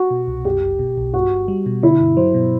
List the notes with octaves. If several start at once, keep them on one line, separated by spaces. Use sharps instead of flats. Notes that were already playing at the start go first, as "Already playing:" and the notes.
Already playing: F#4
B2
C2
F#2 G4
G1
B2
B1
G2 F#4
G1
G3
B2
D3 E4
G2
F#3 C5
B2